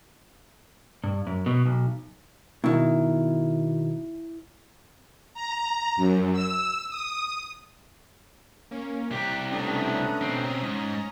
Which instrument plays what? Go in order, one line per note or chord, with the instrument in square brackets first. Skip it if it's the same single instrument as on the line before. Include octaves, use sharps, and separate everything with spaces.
[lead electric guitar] G2
F#2
B2
B1
[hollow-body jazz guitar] B2 D#3 [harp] E4
[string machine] A#5
F#2
E6
D#6
[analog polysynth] A#3 C#4
[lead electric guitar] C2 G4 [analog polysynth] A#5 D6 F#6
[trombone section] A3 B3 D4 [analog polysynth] C#4 A#5 D#6
[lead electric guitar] B2 C4
G#2